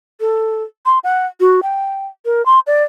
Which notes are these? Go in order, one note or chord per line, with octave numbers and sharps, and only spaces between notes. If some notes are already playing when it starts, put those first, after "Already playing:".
A4
C6
F#5
F#4
G5
A#4
C6
D5